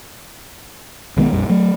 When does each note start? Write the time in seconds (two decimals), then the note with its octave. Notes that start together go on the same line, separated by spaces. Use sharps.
1.17 B1 D#3 G#3 B3
1.31 A#1 F2 G3
1.50 F#3 A3